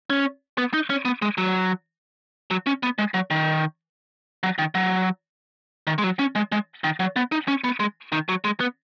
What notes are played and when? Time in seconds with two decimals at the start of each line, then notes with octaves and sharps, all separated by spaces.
0.10 C#4
0.58 B3
0.74 D#4
0.90 C#4
1.05 B3
1.22 G#3
1.38 F#3
2.51 F#3
2.67 C#4
2.83 B3
2.98 G#3
3.14 F#3
3.30 D#3
4.43 F#3
4.58 D#3
4.75 F#3
5.87 D#3
5.98 G#3
6.04 F#3
6.19 C#4
6.35 G#3
6.52 G#3
6.84 D#3
7.00 F#3
7.16 B3
7.32 D#4
7.48 C#4
7.64 B3
7.80 G#3
8.12 D#3
8.29 F#3
8.44 G#3
8.60 B3